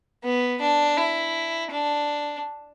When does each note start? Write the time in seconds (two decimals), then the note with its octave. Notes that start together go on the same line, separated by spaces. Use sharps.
0.24 B3
0.61 D4
0.97 E4
1.71 D4